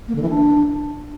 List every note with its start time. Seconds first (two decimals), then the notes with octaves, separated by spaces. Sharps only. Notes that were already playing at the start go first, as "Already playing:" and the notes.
0.08 A#3
0.15 D3
0.22 E3
0.30 D4